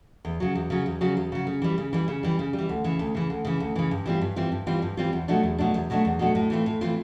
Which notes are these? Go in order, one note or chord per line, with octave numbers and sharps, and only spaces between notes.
E2
C#3 F#3
E2
C#3 F#3
E2
C#3 F#3
E2
C#3 F#3
C#3
E3 G3
C#3
E3 G3
C#3
E3 G3
C#3
G3
E3
D2
C#3 E3
D2
C#3 E3
D2
C#3 E3
D2
C#3 E3
G2
E3 G3 C4 F4
G2
E3 G3 C4 F4
G2
E3 G3 C4 F4
G2
E3 G3 C4 F4
E2
B2 F#3 A3 D4
E2
B2 F#3 A3 D4
E2
B2 F#3 A3 D4
E2
B2 F#3 A3 D4
A2
E3 A3 C4 F4
A2
E3 A3 C4 F4